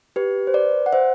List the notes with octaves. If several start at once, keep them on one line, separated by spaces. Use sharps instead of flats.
G4 B4
C5
B4 D5
F#5
C5 E5